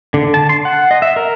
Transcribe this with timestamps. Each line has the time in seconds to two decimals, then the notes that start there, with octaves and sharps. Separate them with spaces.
0.14 D3
0.34 A5
0.49 C6
0.65 F#5
0.91 D#5
1.02 E5
1.16 A#4